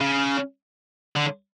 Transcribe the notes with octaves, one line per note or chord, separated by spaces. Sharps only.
C#3
D3